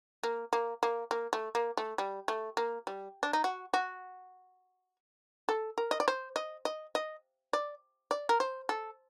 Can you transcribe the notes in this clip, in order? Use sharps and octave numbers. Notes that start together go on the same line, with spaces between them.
A#3
A#3
A#3
A#3
A3
A#3
A3
G3
A3
A#3
G3
D4
D#4
F#4
F#4
A4
A#4
D#5
D5
C5
D#5
D#5
D#5
D5
D5
A#4
C5
A4